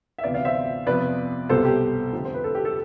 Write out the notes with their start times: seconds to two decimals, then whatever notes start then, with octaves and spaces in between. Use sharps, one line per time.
0.18 E5
0.23 D2 C3 E3 B3 D5 F5
0.34 D5 F5
0.45 C5 E5
0.86 F2 C3 F3 B3 B4 D5
1.49 C2 B2 G3 A4 C5
1.65 G4
2.12 F2 D3 A3 C4
2.25 C5
2.34 B4
2.44 A4
2.55 G4
2.65 A4